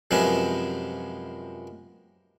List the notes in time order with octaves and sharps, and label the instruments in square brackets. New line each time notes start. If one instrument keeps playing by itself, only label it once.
[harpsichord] F#2 C3 F3 G#3 B3 C#4